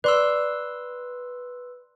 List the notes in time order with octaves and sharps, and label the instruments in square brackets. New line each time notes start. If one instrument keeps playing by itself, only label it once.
[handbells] B4 C6 E6 [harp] D5